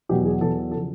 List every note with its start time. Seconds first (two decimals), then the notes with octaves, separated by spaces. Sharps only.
0.09 E2 B2 F#3 G4
0.25 G#4
0.41 E2 B2 F#3 A4
0.72 A4
0.74 C#3 F3